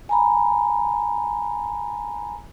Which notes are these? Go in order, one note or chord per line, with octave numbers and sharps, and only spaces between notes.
G#5 A#5 B5